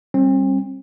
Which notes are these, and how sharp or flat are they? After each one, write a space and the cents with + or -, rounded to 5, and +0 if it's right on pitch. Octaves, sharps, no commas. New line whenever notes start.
G3 +0 C4 +40